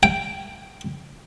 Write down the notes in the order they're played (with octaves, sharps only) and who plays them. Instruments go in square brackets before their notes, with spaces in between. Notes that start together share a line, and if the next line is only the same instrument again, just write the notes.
[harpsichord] G5